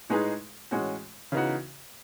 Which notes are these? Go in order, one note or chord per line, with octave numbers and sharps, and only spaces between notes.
A2 G#3 D#4 G#4 B4
A2 E3 G#3 C#4 F#4
C#3 E3 B3 D#4 F#4